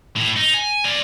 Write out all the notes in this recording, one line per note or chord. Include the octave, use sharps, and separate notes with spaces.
A2
D#4
G#5
D5 F5